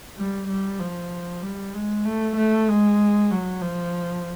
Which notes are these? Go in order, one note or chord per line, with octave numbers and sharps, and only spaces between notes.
G3
G3
F3
G3
G#3
A3
A3
G#3
F#3
F3